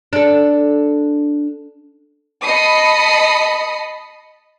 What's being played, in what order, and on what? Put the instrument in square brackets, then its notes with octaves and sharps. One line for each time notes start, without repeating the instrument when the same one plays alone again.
[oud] D4 A4
[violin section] D#5 A5 B5 D#6 C7 C#7